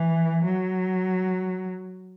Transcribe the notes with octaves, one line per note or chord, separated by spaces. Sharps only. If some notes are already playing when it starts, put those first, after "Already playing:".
Already playing: E3
F#3